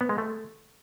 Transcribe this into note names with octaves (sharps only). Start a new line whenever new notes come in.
B3
G#3
A3